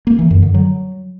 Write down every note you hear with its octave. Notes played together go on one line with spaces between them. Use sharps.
A#3
E3
F#2
D3
F#3